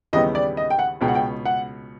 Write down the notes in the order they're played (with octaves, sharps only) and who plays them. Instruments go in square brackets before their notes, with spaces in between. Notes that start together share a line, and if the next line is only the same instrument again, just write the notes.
[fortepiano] D#2 C#3 E3 G3 B3 [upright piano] D#5
[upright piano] D5
D#5
G5
F#5
[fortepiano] C#2 B2 G#3 [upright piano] G5
[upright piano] F#5
G5
F#5